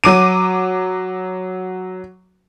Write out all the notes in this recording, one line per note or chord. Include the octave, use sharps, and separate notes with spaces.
F#3 D6 D#7